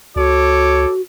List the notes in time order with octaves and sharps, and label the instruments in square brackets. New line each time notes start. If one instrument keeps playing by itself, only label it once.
[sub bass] C#2 [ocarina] F#4 [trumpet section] A4 C#5 D6